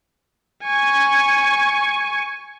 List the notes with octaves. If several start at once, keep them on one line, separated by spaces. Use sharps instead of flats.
G#5 C#6